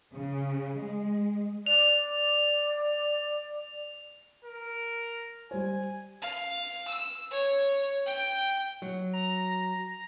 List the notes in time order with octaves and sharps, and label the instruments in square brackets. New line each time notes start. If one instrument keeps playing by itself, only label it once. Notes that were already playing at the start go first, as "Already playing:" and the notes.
[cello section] C#3
G#3
[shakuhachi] D5 [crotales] F7
[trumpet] A#4
[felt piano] G3 C5 [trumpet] G#5
[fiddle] F5
E6
C#5
G5
[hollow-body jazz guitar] F#3
[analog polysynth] A#5